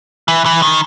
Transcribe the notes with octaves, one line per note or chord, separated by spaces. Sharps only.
E3
E3
D#3